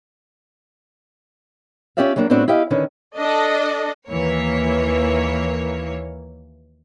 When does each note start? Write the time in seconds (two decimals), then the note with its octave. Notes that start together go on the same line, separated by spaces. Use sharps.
1.97 C#4 F4 G4 D5 E5 F5
2.16 F#3 G3 A#3 D4
2.30 A2 B3 C4 D4 F#4
2.48 E4 G4 D#5 F5
2.71 D3 D#3 C#4 B4
3.17 D4 A4 D#5
4.09 D#2 E3 A#3 C#5